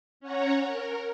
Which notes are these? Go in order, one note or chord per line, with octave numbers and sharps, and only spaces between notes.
C#4 C#5 F#5 A#5
A#4